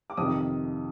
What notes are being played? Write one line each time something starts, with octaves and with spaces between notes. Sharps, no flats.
D6
F2 C3 D#3 D#6